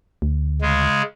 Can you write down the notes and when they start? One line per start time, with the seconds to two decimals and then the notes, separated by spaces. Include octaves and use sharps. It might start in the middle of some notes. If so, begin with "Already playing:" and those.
0.22 D2
0.61 C#3 G#3